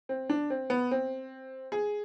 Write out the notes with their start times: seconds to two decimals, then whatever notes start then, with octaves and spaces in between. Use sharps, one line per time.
0.09 C4
0.30 D4
0.50 C4
0.70 B3
0.91 C4
1.72 G#4